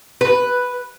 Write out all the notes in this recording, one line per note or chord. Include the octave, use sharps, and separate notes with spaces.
B4